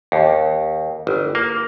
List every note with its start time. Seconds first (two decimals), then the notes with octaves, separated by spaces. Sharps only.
0.12 D#2
1.07 G1
1.35 A#3